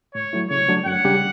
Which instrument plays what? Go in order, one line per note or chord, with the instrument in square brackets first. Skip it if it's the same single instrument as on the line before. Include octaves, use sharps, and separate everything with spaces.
[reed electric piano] A2 [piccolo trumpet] C#5
[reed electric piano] F#3 A3 E4
[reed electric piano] C#3 [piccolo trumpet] C#5
[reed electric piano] F#3 A3 D4
[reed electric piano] F#2 [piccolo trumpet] F#5
[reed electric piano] C#3 G3 D4 G4